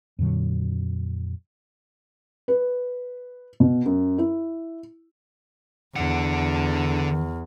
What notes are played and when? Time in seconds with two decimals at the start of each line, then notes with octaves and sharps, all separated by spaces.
0.19 F2 A#2 D3 F#3
2.48 B4
3.60 B2
3.86 F#2
4.18 E4
5.96 E2 D3 F#5